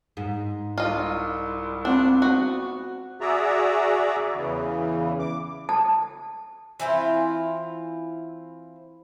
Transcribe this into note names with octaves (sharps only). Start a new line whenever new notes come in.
G#2
C2 F4 D#5
C4 D4 F4 F#5
B3 F#4 F#5
F#4 G#4 D5 E5 A#5
E2 C#3 E3
D6
A5
E3 C4 E4 F4